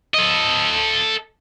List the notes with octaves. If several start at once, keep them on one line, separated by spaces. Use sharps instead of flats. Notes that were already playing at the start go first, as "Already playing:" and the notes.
A4 D#5